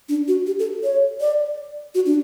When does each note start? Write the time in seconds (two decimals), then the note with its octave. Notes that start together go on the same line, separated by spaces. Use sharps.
0.09 D4
0.28 F#4
0.47 G4
0.59 A4
0.84 C#5
1.21 D5
1.95 F#4
2.06 D4